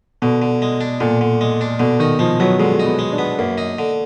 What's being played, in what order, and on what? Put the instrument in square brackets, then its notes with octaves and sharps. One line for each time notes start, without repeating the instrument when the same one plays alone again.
[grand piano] B2 [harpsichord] D3
[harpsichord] D3
G#3
D4
[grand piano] A#2 [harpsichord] D3
[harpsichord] D3
G#3
D4
[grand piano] B2 [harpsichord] D3
[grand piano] D#3 [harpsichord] D#4
[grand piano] F3 [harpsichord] G#3
[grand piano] F#3 [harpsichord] B3
[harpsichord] D3 [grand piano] G#3
[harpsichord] D#4
[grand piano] B3
[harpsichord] G#3
[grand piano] D4
[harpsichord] B3
[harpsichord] F#2 [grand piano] A#3
[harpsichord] D#4
D3